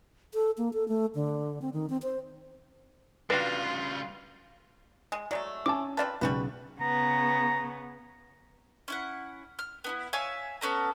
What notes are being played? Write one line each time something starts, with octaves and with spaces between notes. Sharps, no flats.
A4
A#3
A4
A3
D3
C4
D#3
C4
C5
C#3 G3 D4 F4 F#4 B4 F5 G5
G#3
F#3 G#3 A3 D5
C#4 G#5 A5 D6
C4 F4 B4 D5 A5
B1 C#3 G3 F#4 B4
C#3 B3 A#5
C#4 E4 F#5
F6
B3 D#4 E4
C#5 E5 F5 G#5
B3 C#4 A4 A#5